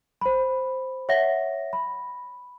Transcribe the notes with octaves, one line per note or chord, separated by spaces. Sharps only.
C5 B5
C#5 E5 F#5 A#6
B5